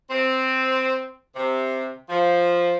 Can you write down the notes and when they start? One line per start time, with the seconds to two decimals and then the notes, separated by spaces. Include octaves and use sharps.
0.10 C4
1.36 C3
2.09 F3